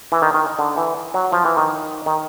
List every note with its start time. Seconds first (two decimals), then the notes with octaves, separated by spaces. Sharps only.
0.12 E3
0.22 D#3
0.34 D#3
0.59 D3
0.77 E3
1.14 F#3
1.33 F3
1.45 E3
1.57 D#3
2.06 D#3